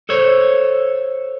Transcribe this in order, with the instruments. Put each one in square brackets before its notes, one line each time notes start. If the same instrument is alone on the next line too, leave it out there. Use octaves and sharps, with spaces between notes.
[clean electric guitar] A4 C5 C#5